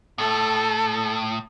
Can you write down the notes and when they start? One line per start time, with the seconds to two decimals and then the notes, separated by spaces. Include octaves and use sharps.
0.18 A2 A4